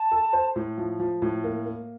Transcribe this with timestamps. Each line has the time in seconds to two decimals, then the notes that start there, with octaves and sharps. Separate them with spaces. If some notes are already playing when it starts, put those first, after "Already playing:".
Already playing: A5
0.12 A4
0.33 C5
0.56 A2
0.78 F3
1.00 F3
1.22 A2
1.44 A#3
1.66 A#3